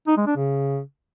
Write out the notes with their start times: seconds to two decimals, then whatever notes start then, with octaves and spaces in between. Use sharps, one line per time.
0.08 D#4
0.17 G#3
0.27 D4
0.36 C#3